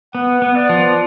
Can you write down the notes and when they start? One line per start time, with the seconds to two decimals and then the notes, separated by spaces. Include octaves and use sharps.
0.15 B3 F#5
0.42 B3
0.55 D5
0.69 F3